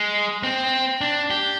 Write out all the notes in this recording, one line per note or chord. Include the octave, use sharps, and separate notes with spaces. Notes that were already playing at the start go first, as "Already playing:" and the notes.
Already playing: G#3
C4
D4
G4